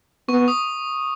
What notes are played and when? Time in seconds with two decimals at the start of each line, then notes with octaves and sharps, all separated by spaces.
0.29 B3 C#6
0.48 D#6